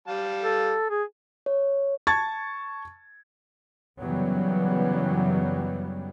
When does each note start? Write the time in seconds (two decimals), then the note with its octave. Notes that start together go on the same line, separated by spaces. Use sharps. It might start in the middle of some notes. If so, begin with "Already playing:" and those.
0.08 G3 F5 A5
0.43 A4
0.90 G#4
1.46 C#5
2.07 A5 C#6 G#6 A6
4.00 F#2 C#3 E3 F#3 G3 B3